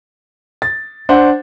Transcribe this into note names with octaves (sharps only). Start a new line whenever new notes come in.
A6
D4 C5 F#5